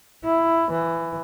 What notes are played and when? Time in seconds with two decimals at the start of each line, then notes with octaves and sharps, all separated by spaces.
0.24 E4
0.71 E3